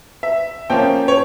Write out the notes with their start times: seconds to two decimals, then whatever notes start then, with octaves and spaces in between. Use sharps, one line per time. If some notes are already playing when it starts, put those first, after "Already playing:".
0.23 E5
0.70 F3 A#3 C#4 G5
1.08 C#5